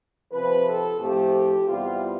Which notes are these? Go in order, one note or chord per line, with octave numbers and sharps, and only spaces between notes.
C3 F3 C4 B4
A4
A2 F3 A3 C4 G4
E2 C3 E3 G3 B3 F4